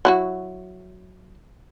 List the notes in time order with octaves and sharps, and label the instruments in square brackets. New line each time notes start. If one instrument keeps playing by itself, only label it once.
[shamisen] F#3 E4 F#4